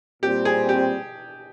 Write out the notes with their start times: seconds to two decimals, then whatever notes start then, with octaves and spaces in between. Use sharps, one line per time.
0.23 A#2 G3 C4 G4
0.45 G#4
0.69 G4